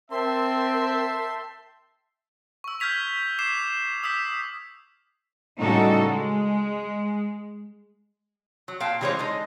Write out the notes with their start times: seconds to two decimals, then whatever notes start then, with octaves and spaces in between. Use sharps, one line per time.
0.11 C4 A#4 E5 G5 A5 C6
2.64 C#6 E6
2.80 F6 G6 G#6 B6 F7
3.39 D6 C7 E7
4.03 D#6 E6 G6 B6
5.58 A2 C#3 G3 D#4 F#4 A4
6.06 G#3
8.68 F#3
8.80 A#2 F5 G5 A5
9.01 E3 G3 G#3 G4 C5 C#5
9.19 D3 G#3 D#4 D#5